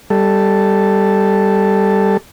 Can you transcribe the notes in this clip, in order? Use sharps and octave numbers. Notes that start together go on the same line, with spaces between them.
G3 A4